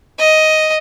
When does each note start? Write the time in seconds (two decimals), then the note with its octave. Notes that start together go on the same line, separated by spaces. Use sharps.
0.19 D#5